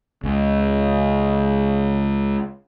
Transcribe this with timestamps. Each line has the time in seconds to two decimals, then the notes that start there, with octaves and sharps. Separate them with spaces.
0.24 C#2 C#3